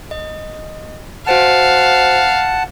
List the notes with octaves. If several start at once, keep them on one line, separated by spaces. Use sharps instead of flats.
D#5
F#4 C5 F5 F#5 A5 F#6